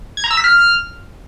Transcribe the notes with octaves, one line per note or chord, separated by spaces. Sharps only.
G#6
A#5
E6
B6
F6